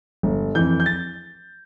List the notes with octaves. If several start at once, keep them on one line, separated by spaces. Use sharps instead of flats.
G1
F2 E3 G6
G6
A6